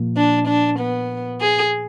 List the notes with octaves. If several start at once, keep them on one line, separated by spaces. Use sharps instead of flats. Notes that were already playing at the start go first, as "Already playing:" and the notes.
Already playing: A#2 F3 A#3 F4
D4
D4
B3
G#4